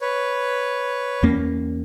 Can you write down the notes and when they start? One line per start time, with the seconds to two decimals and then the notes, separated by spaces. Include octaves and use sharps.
0.01 B4 C#5
1.23 E2 A#3 C#4